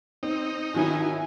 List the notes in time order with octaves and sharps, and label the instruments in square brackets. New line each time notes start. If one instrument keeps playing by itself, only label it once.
[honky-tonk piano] C4 [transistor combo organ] D#4
[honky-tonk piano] D#3 F#3 E4 [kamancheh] G#5